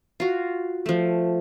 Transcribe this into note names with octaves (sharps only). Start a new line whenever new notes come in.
F4 F#4
F3 A3